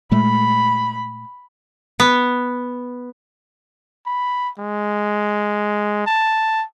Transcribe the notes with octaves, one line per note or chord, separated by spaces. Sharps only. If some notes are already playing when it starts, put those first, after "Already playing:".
A#2 G#3 A3 B5
B3
B5
G#3
A5